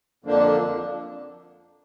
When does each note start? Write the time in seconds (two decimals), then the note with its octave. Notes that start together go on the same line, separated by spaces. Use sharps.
0.25 F2 D3 F3 A#3 D4